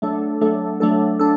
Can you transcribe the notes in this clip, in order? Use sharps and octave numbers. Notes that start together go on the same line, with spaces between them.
F#3 A3 D4 A4
F#3 A3 D4 A4
F#3 A3 D4 A4
D4 A4